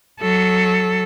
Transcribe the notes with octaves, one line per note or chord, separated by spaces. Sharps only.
F#3 A4